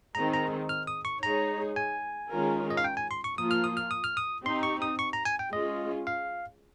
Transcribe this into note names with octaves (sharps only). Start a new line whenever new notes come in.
D#3 G#3 C4 D#4 A#5
A#5
F6
D#6
C#6
G#3 D#4 G#4 C#5 A#5
G#5
D#3 G#3 C#4 F4 A#4
D#5
F5
G5
G#5
C6
C#6
F3 A#3 F4 D#6
F6
D#6
F6
D#6
F6
D#6
C4 D#4 G4 C6
C#6
D#6
C#6
A#5
G#5
G5
G#3 C#4 F4 D#5
F5